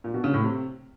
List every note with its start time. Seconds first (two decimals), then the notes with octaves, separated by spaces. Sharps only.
0.04 A#2
0.14 B2
0.24 C#3
0.34 A2
0.43 C3